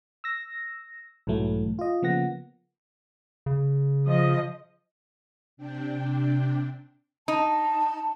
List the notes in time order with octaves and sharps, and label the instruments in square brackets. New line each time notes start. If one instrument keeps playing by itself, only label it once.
[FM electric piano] E6 A#6
B1 G#2 E3 F#3 A3
F4 D#5
C#3 F3 A#3 B3 F#5 A#6
[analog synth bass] C#3
[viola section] F3 D#5
[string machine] C3 D4 G5
[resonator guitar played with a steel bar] D#4 [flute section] A5